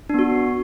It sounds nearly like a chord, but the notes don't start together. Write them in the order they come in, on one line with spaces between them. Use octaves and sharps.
D4 B3 F#4